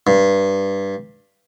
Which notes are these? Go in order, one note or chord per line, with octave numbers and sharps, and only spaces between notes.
G2